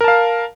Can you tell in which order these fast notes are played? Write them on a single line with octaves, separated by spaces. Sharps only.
A#4 A5 F5